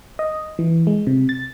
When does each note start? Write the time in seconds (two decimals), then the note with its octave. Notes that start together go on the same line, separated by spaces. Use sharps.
0.19 D#5
0.59 E3
0.87 G#3
1.07 C3
1.29 A6